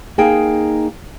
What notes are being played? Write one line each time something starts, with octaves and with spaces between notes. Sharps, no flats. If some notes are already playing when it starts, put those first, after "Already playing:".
A#3 D#4 G#4 G5